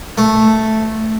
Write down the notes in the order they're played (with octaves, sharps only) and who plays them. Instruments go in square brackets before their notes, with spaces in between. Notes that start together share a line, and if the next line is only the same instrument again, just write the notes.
[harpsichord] A3